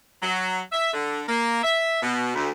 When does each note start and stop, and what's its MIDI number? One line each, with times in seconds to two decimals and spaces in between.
0.22 0.61 54
0.72 0.94 76
0.94 1.22 50
1.28 1.61 58
1.64 1.99 76
2.02 2.34 47
2.35 2.50 38